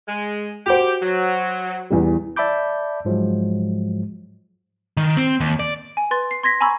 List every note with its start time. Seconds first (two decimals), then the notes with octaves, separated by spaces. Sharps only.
0.07 G#3
0.66 F#4 G4 C5
1.02 F#3
1.90 E2 E3 G3
2.36 D5 E5 A5 B5 D6 G6
3.05 G#2 F3 F#3 G#3
4.97 D#3
5.17 C4
5.40 D#2
5.60 D5
5.97 G#5
6.11 B4 C6 A6
6.31 C7
6.43 C6 G#6 A#6 B6
6.61 G#5 A#5 B5 C#6 E6 G#6